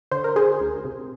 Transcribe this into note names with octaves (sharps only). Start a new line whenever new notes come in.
D3 C5
A#4
D3 G#4 C5
D2
C3